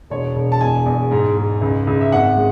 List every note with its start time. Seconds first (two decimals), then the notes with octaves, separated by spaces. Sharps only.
0.10 E1 C#5
0.35 E1
0.52 A5
0.61 E2 G#5
0.86 E2
1.11 G#2
1.36 G#2
1.62 C#2
1.87 C#2
2.01 E5
2.12 G#1 F#5
2.37 G#3